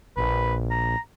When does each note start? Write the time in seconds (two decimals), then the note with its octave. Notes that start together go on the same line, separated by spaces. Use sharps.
0.17 A#1 B4
0.71 A#5